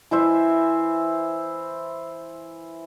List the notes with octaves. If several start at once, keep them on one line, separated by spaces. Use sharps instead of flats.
E3 E4 C5 E5